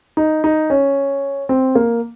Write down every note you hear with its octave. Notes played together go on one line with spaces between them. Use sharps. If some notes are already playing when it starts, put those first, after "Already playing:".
D#4
D#4
C#4
C4
A#3